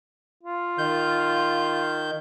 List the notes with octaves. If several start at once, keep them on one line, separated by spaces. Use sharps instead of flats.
F4
D#3 G6